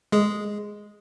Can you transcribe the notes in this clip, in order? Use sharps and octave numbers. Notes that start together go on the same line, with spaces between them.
G#3 G#4